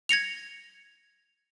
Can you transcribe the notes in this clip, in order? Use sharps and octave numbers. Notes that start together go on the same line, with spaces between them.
G#6 A#6 C#7 F7